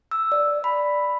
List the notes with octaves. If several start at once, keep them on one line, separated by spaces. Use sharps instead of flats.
E6
D5
B5